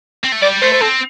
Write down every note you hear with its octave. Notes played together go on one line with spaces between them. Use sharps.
C4
A3
G3 D5
A3 C5
C5
C4 A4